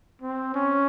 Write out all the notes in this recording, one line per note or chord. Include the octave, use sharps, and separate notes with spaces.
C4
C#4